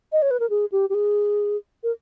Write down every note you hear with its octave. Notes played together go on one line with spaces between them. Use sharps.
D#5
C#5
B4
A#4
G#4
G4
G4
G#4
A#4